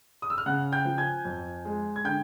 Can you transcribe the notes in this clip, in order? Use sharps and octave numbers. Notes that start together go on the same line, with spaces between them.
D#6
E6
F6
C#3 F#5 F#6
G5 G6
F3
G#5 G#6
F2
G#3
G#6
D3 G5 G6